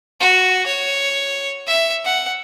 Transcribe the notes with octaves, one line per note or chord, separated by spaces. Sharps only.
F#4
C#5
E5
F#5